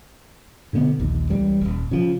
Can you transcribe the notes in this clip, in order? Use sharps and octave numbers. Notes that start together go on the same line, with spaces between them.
B2 D3 G#3 B3
A#1 D#2
C#2 E3 G3
D#1 A#1
C#3 F3